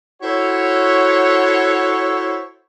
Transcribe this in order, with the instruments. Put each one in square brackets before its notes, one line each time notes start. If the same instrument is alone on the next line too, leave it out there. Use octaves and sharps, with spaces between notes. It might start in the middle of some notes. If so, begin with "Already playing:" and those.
[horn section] E4 F#4 A4 C5 C#5